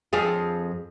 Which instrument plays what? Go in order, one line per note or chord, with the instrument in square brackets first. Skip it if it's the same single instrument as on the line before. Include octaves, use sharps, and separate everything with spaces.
[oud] F2 F4 G#4